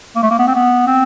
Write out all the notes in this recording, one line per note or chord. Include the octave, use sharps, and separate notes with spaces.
A#3
A3
A#3
B3
C4
B3
C4